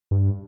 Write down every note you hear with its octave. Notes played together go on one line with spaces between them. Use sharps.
G2